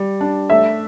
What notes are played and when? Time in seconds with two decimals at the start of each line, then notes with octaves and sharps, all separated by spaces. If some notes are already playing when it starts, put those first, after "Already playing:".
Already playing: G3
0.21 D4
0.50 A3 E5